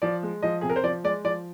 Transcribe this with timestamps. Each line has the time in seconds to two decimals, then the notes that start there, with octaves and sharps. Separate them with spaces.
0.02 F3 D5
0.23 G#3
0.43 F3 D#5
0.61 C3 G#4
0.69 A#4
0.76 C5
0.84 F3 D5
1.04 G#3 D5
1.24 F3 D5